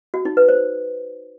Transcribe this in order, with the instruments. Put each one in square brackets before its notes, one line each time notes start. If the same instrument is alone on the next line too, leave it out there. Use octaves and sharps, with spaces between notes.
[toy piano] F#4
D#4
B4
C5